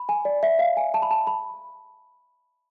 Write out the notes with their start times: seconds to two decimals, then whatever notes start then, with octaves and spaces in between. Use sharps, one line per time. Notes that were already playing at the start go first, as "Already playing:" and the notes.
Already playing: B5
0.09 G#5
0.25 D5
0.43 E5
0.59 F5
0.77 G#5
0.94 A5
1.02 B5
1.11 A5
1.27 B5